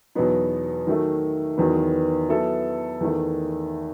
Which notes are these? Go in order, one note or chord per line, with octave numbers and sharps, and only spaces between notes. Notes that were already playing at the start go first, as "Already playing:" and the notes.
E2 B2 F#3 B3 D#4
D#3 F#3 A3
E2 D#3 F#3 B3
F#3 B3 E4 A4
E2 D#3 A3